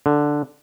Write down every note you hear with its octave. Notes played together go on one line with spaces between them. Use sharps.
D3